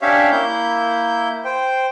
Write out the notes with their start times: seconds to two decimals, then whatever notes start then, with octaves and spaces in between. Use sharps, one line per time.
0.02 C#4 D4 G4 C#5 E5 F5
0.32 A#3 E4 G6
1.45 C5 G5